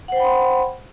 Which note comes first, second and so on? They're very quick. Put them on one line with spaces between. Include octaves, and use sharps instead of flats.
F#5 C5 G5 B5 C6